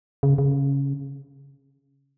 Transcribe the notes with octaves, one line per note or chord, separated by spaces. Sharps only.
C#3
C#3